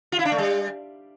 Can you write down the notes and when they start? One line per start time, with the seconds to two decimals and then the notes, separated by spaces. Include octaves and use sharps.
0.12 F4
0.19 E4
0.25 D4
0.32 A3
0.38 G3